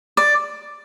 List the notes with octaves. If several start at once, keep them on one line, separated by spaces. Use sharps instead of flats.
D5